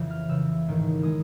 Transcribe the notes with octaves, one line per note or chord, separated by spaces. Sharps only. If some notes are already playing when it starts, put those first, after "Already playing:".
Already playing: F2 C#3 E3
F6
F2 C#3 E3 E6
A1 G#2 D#3 G#3
D#3 G#3 D#6